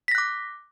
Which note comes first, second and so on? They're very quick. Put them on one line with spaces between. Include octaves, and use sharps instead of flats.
B6 A#6 F#6 D6